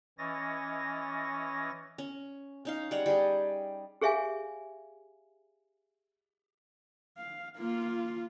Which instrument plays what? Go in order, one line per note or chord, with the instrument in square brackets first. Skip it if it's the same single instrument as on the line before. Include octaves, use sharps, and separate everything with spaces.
[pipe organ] E3 C#4 C#5 D#5 A6 A#6
[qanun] C#4
C#4 D#4 F5
G3 G#3 C#5 F#5
G3 G#4 D#5
[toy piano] G4 G#4 C#5 E5 F5 G#5
[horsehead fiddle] F5
A#3 F4